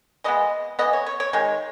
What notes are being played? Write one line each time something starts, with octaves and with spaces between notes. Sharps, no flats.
E3 G#3 B3 D#5
E3 B3 D#5
C#5
C#5
C#5
D#3 G#3 C#5